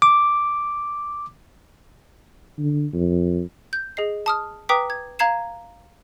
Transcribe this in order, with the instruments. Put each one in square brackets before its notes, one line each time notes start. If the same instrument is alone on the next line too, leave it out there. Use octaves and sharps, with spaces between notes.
[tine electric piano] D6
[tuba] D3
F2
[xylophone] G6
G#4 D#5 C7
A5 D#6 F6
B4 G5 A#5 D6 D#6 B6
G#6
F5 A#5 G#6 C7 E7